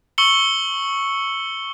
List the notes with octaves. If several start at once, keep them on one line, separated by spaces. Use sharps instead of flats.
C#6 E6 C#7 F#7 G7